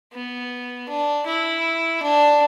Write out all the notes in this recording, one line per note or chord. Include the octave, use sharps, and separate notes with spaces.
B3
D4
E4
D4